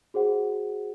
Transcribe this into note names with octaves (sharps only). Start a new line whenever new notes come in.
F#4 G#4 C5 F#5